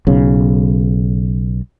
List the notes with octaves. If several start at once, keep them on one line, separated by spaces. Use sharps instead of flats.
B1 C#3